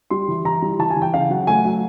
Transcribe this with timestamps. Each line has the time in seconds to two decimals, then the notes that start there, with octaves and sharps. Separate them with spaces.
0.10 G3 C6
0.28 E3
0.45 E3 A#5
0.62 G3
0.79 E3 A5
0.90 G#5
0.97 E3
1.02 G5
1.13 C#3 F5
1.30 F#3 F#5
1.47 A3 G#5
1.65 F#3